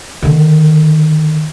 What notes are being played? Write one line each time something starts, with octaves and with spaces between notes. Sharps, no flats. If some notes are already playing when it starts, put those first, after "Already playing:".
D3 D#3